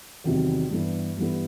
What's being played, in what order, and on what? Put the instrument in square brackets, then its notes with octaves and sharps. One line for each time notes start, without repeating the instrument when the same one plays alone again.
[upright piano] E2 C3 D#3 F#3
G2 E3 G3 B3
G2 E3 G3 B3